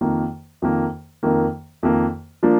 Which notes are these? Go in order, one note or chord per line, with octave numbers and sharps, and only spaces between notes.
F2 D#3 A#3
F2 D#3 A#3
F2 D#3 A#3
F2 D#3 A#3
F3 A#3 D4